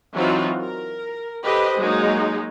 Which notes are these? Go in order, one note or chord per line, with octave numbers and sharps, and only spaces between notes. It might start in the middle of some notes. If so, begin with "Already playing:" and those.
E3 F#3 C4 D#4 F4 F#4
A#4
G4 A4 B4 C5 D#5
F#3 G#3 A#3 D#4